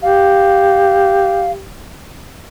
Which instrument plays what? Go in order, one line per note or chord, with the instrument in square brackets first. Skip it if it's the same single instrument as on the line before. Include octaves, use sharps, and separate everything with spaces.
[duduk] G4 [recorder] F5